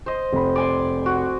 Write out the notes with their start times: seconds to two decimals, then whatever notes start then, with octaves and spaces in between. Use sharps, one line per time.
0.06 C5 D#5
0.33 F1 B5
0.56 D5 G#5 C6
1.06 F#4